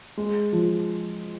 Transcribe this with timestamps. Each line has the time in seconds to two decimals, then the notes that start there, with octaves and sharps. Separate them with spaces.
0.17 G#3
0.53 F3